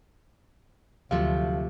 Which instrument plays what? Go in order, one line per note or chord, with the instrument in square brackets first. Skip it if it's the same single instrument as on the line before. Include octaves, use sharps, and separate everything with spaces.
[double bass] D2 [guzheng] C3 F3 A3 [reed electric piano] F#3 F5